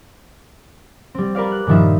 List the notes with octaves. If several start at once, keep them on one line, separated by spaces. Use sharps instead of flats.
G3 C4
A#4 B4 D5 F5
F#6
G2 A#2 D#3 F3 D#4 E5